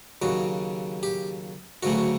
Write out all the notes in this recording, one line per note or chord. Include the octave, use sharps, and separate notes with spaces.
D#2 C#3 F#3 F#4
G4
D2 C#3 F#3 A3 F#4